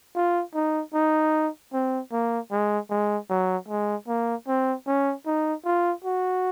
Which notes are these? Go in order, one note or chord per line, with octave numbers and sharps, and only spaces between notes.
F4
D#4
D#4
C4
A#3
G#3
G#3
F#3
G#3
A#3
C4
C#4
D#4
F4
F#4